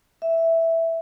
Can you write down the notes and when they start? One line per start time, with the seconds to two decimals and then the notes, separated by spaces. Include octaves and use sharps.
0.22 E5